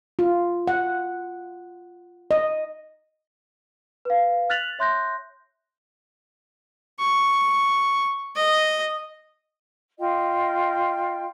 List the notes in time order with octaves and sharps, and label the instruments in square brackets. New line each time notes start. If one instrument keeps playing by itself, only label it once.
[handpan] F4
F#5
D#5
[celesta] B4 F5
F6 F#6 A6 B6 F7 F#7
C#5 E5 C6 F#6 G6 A#6
[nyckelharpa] C#6
D#5
[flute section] F4 D#5 G5